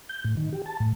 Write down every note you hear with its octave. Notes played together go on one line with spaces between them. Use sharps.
G6
A2
D#3
G4
A5
A2